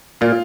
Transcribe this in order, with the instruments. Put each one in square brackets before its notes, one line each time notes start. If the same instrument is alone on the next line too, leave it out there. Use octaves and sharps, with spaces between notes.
[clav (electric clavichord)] A#2 [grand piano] F4